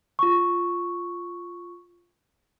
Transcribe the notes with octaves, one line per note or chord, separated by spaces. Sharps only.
F4 C#6